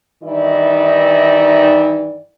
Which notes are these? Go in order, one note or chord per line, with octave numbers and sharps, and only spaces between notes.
G2 D#3 E3 D#4 E4 D5